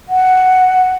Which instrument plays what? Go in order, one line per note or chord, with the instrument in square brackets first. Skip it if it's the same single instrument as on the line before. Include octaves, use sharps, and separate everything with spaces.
[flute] F#5